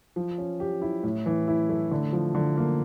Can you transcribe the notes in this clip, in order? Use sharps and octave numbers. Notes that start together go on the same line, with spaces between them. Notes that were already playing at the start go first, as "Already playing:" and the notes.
F3
C#4
G4
E4
A2
E3
E4
A3
D3
F3
D3
A#3